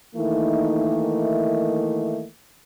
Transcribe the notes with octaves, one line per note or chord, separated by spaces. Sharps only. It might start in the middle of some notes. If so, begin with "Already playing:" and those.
D#3 E3 A3 A#3 D#4 E4